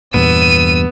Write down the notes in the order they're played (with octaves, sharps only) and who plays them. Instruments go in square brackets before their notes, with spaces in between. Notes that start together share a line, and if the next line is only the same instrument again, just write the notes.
[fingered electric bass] E2 G2 A#2 [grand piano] B3 [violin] E6 D#7